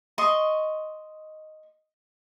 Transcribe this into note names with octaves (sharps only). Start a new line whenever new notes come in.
D#5 C6 C#6